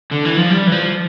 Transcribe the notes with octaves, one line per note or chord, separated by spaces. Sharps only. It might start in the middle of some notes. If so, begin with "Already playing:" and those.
D3
E3
F3
G3
E3
F3